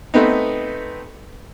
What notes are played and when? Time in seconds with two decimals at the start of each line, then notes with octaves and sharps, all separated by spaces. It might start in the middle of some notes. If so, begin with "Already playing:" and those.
0.14 A3 B3 C4 D#4